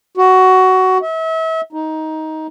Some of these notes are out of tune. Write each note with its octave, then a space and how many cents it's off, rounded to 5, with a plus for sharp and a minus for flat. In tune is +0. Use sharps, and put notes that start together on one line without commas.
F#4 +15
E5 -35
D#4 +15